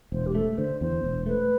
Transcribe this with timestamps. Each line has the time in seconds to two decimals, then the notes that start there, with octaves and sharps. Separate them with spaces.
0.12 E1 C5
0.26 G4
0.35 A3 A4
0.57 D3 C5
0.81 E2 C5
1.04 E1
1.26 A3 B4